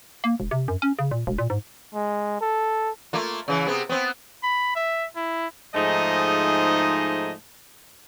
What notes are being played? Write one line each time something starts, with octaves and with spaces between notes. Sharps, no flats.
A#3
E1
C3
F#2
C#4
C#3
A#2
E1
A#2
G#2
G#3
A4
A3 A#3 F4
C#3 E3
C3 B3 G#4
B3 C4
B5
E5
E4
G#2 F3 A3 D#4 G#4 D#5